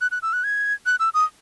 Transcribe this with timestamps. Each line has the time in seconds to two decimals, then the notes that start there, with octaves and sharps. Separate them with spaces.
0.01 F#6
0.11 F#6
0.22 E6
0.33 F#6
0.44 G#6
0.86 F#6
0.99 E6
1.14 D#6